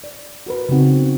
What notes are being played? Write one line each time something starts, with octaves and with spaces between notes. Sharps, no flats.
D5
F#4 A#4 B4
C#3 F#3 B3 C4 D#4 F#4